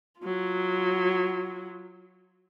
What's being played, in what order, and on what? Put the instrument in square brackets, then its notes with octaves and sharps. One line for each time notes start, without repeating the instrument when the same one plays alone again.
[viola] F#3 F4